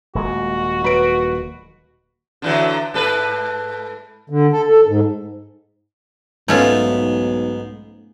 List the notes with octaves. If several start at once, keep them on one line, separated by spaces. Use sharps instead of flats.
D#1 G#3 A#3 F#4
F#3 B4 D7
D3 E3 F#3
G#2 A4 B4
D3
A4
A4
G#2
B1 G#2 A3 B3 C#4 F4